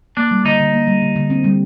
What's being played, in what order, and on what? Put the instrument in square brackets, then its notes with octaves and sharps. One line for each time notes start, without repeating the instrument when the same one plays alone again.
[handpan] A#3 [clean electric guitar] D4
[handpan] G3
[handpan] D3 [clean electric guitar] D#4
[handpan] D3
A#3
G3
D3
D3
C4
G3